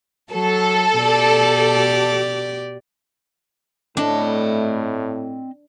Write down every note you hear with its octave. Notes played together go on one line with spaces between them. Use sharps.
F#3 A4
B2 G4 D5
A2 A3 C4 D4 D#5